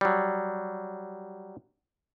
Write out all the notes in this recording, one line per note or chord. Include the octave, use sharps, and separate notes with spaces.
F#3 G3